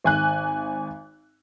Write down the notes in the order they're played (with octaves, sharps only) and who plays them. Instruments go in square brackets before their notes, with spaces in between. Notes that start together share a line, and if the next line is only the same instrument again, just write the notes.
[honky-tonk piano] G#1 G#5 F#6